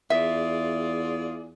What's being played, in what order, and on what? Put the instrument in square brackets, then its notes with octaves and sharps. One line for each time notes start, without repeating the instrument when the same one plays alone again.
[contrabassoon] E2 [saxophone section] F4 G#4 D5 [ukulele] E5